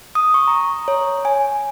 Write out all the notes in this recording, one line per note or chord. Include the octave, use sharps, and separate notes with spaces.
D#6
C#6
A#5
C#5
G#5